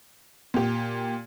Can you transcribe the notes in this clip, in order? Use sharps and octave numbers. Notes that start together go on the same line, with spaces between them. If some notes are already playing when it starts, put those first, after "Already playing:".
A#2 G4